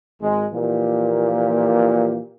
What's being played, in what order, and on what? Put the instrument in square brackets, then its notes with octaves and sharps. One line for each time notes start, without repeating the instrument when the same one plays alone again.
[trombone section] G#1 G#3
A#2 E3 F3 A#3 G4